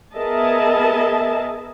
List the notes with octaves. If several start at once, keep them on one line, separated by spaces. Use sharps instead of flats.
B3 G#4 A#4 D#5 E5 A5